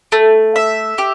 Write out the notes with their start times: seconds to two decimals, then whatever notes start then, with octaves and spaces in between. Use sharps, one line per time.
0.12 A3
0.56 E5
0.98 G4